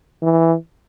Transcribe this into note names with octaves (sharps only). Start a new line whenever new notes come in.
E3